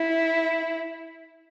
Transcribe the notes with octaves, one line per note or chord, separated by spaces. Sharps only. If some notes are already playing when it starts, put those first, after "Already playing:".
Already playing: E4